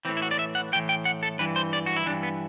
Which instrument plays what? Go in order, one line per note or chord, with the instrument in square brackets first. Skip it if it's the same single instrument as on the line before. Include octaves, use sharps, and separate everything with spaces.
[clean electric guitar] E3 C4
A2
E4
F#4
D5
E5
F#5
A2 G5
E3
G5
F#5
A4
G2 E3 B4
C5
D5
F#4
E4
E3 D4
G2
B3